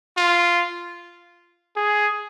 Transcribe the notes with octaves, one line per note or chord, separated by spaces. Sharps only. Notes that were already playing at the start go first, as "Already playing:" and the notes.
F4
G#4